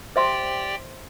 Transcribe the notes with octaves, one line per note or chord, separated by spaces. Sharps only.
G4 C5 D5 E5 G5 C6